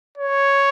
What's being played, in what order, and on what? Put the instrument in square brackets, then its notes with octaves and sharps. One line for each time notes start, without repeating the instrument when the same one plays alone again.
[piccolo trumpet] C#5